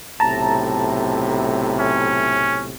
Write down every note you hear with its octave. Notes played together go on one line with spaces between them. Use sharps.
B1 A2 C3 A5 A#5
C#4